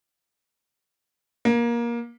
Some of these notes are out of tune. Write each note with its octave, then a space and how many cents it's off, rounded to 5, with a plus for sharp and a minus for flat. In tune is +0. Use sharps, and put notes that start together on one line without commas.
A#3 +20